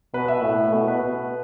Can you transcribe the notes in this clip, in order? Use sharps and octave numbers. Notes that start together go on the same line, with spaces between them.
B2 B4
E5
A2
B2
B4
B2